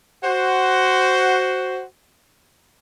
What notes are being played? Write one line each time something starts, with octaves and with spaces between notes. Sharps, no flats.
F#4 C5